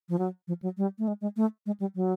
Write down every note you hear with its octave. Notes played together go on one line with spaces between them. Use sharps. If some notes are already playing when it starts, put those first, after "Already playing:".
F3
F#3
F3
F#3
G3
A3
G#3
G#3
A3
G#3
G3
F#3